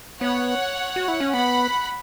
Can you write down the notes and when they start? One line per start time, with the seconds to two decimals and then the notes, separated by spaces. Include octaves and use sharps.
0.21 B3 C#5 F#5
0.96 F#4
1.08 E4
1.20 C#4
1.33 B3 F#5 B5